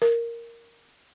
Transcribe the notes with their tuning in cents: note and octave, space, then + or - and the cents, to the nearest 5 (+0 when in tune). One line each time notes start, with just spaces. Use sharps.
A#4 -5